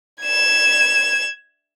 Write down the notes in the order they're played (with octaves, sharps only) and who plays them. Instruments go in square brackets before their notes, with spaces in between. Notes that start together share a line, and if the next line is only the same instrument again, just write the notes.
[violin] G#6 E7